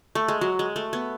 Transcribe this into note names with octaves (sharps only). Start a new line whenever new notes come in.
A3
G#3
F#3
G#3
A3
B3